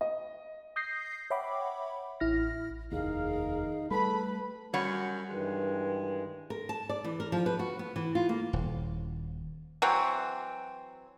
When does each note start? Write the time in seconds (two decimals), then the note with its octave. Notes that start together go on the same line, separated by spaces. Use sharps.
0.01 D#5
0.76 D#6 G6 A#6 C7
1.30 C#5 E5 F#5 G5 B5 D6
2.20 A1 E4 F6 A#6
2.92 F1 D#2 D#4 G#4 A#4 F5
3.91 G3 A3 A4 B4 B5
4.74 F#2 G3 C#5 F#5
5.29 G2 D#3 E3 G#3
6.50 A#4
6.69 A5
6.89 D5
7.04 E3
7.20 A#4
7.32 F3
7.46 B4
7.59 F#4
7.79 B3
7.96 E3
8.15 F4
8.29 A#3
8.53 D#1
9.82 E3 F#3 C4